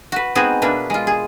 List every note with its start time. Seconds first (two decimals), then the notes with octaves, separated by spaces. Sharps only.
0.12 F#4 B4
0.35 G#3 B3 C4 D#4 F#4 G#4
0.62 B2 A#3 D4 B4 E5
0.90 G#3 F4
1.07 G#4